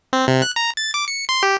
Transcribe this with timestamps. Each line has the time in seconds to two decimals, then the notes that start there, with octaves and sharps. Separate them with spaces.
0.13 C4
0.28 C3
0.42 F#6
0.56 A#5
0.77 A6
0.94 D6
1.08 C#7
1.29 C6
1.43 G4